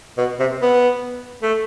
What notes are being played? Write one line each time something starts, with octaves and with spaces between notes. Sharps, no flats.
B2
C3
B3
A3